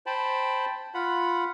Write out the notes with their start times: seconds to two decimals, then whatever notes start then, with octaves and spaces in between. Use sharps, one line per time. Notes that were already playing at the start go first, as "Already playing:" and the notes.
0.06 C5 G5 A5 B5
0.94 F4 F#5 B5